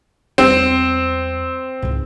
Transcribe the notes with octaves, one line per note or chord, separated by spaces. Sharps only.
E2 G3 C4
C#2 G#2